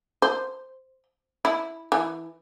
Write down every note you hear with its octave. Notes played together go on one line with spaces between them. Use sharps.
C5
E4
E3